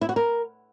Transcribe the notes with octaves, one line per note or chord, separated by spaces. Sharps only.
E4
F#4
A#4